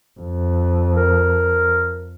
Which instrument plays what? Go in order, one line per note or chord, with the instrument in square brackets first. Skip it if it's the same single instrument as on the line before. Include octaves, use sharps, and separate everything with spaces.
[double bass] F2
[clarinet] A#4